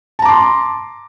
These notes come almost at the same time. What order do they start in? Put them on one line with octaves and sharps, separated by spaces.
A5 A#5 D6 C6